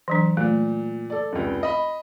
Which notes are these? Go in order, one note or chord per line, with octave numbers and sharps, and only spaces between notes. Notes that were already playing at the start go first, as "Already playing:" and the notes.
E3 F#3 D4
A#2 A3
A4 D5
F1 C#2
D#5 B5